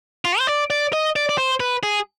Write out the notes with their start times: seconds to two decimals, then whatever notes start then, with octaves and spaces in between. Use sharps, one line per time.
0.25 F4
0.39 C5
0.47 D5
0.70 D5
0.93 D#5
1.16 D5
1.29 D5
1.38 C5
1.60 B4
1.83 G#4